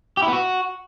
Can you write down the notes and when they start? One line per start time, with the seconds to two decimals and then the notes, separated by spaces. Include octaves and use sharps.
0.17 G4
0.22 E4
0.28 B3
0.33 F#4